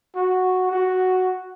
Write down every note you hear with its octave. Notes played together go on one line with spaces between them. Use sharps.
F#4
F#4